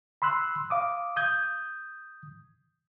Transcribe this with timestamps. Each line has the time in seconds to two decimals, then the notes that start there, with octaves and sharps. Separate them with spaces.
0.22 B5 C6 E6 F#6
0.70 F5 D6 D#6
1.16 D#6 G6 G#6